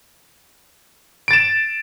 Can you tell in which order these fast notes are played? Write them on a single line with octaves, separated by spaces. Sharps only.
D7 A6 E7